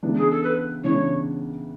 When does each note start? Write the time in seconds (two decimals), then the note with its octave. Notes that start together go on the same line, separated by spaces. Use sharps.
0.03 C#2 C#3 E3 B3 D4
0.16 G#4
0.30 A4
0.43 B4
0.83 C#2 C#3 E3 B3 D4 C#5